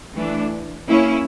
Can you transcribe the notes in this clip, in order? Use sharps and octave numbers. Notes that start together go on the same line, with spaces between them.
E3 A3 D4
A#3 C#4 E4